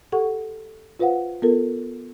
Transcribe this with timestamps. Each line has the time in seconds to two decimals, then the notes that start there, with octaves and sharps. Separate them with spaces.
0.12 G4 A4 F#5 C#6
0.99 F4 B4 C5 F5 F#5
1.42 B3 F4 A4 A#4